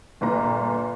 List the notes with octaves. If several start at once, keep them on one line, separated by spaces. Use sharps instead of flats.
G1 A#2 B4 A#5